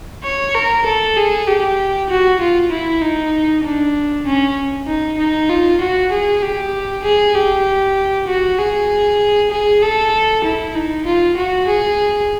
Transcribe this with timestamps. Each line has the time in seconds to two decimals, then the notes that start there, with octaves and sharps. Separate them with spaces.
0.24 C#5
0.55 A#4
0.86 A4
1.17 G#4
1.47 G4
2.10 F#4
2.40 F4
2.71 E4
3.02 D#4
3.64 D4
4.26 C#4
4.87 D#4
5.18 D#4
5.49 F4
5.81 F#4
6.11 G#4
6.42 G4
7.04 G#4
7.35 G4
8.27 F#4
8.59 G#4
9.51 G#4
9.82 A4
10.44 E4
10.75 D#4
11.05 F4
11.37 F#4
11.67 G#4